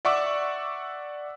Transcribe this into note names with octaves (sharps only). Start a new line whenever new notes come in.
D5 E5 F#5 C#6 D6 E6